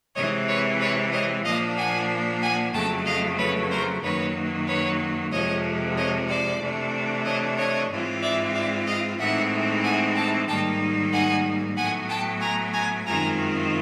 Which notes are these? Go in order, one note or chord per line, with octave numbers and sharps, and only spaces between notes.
C3 E3 G#3 C4 C#5 D#5
B4 C#5
B4 C#5
C#5 D#5
A#2 F3 A#3 D4 D#5 F5
F#5 G#5
F#5 G#5
F2 C#3 F#3 A3 G5 A5
D#5 F5
B4 C#5
A#4 C5
F#2 D#3 F#3 A#3 B4 C#5
B4 C#5
F2 C3 F3 G#3 C#5 D#5
C#5 D#5
C5 D5
C3 E3 A3 D4
C#5 D#5
C#5 D#5
G#2 E3 G#3 C4 F4
D5 E5
D5 E5
D#5 F5
A2 E3 G#3 C4 D#4 E5 F#5
F#5 G#5
G5 A5
G#2 D#3 G3 A#3 D#4 G5 A5
F#5 G#5
A2 F#3 B3 F#5 G#5
G5 A5
G#5 A#5
G#5 A#5
F#2 D#3 G#3 C4 F4 G#5 A#5